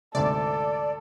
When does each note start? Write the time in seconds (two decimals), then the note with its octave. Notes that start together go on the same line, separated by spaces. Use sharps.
0.15 D2 G#2 C3 A4 D5